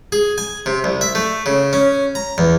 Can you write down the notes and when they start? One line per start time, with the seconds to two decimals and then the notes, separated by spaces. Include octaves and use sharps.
0.12 G#4
0.38 G#5
0.66 C3
0.84 C2
1.01 E5
1.15 A3
1.46 C#3
1.73 C#4
2.15 A#5
2.38 E2